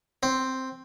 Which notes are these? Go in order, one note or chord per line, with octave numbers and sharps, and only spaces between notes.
C4